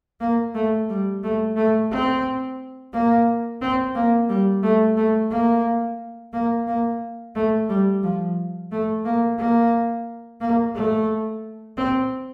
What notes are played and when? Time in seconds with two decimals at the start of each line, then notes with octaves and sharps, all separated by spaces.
0.20 A#3
0.55 A3
0.89 G3
1.23 A3
1.56 A3
1.91 C4
2.93 A#3
3.61 C4
3.95 A#3
4.29 G3
4.63 A3
4.97 A3
5.31 A#3
6.33 A#3
6.67 A#3
7.35 A3
7.69 G3
8.03 F3
8.71 A3
9.05 A#3
9.38 A#3
10.40 A#3
10.75 A3
11.77 C4